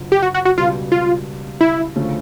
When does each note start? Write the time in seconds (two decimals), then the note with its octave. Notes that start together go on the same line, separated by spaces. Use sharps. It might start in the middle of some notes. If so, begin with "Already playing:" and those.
Already playing: F#1 F#2 D3 F3
0.12 G4
0.22 F#4
0.34 F#4
0.45 F#4
0.58 C#2 B2 G3 F4
0.92 F4
1.61 E4
1.96 D2 C#3 F3 A3 C#4